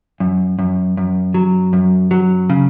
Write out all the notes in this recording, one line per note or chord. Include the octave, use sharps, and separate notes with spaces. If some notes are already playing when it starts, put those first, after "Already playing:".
F#2
F#2
F#2
F#3
F#2
F#3
C#3